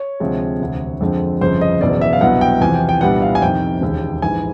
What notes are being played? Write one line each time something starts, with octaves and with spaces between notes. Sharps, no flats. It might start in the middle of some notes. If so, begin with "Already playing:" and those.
Already playing: C#5
D2 C3 F3 G#3 C4
E1 D2 C3
F2 D3 F3 G#3 C4
G1 F2 C#3 F3 C5
D#5
F#1 E2 B2 D5
E5
F5
C2 B2 F#3 B3 D4 F#5
G5
E2 C3 F3 G#5
G5
G5
C2 A#2 G3 B3 D4 F#5
F5
G#5
F2 C3 D#3 G5
E1 D#2 C#3
A#1 G#2 E3 G#5